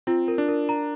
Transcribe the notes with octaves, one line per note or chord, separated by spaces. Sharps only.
C4 F4
A#4
D4
A#4
A#5